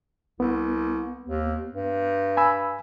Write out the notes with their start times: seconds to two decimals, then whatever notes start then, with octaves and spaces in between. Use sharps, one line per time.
0.40 C2 B3
1.28 D#2
1.73 G2
2.37 G#5 B5 E6